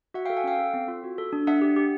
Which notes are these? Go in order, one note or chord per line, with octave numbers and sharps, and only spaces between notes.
F#4 E5 F#5
F5 G5
A4
F#5 G#5
C#4 F5 G5
A4
C4
F4
F#4
A4
D4
D4 E5 F#5
G4
G4